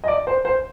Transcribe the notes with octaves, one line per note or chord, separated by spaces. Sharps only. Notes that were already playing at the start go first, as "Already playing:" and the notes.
D#5
D5
C5
C5